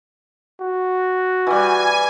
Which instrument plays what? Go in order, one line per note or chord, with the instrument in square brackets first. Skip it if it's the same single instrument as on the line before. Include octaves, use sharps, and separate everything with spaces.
[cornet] F#4
[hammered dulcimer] E3 G3 [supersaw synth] G#5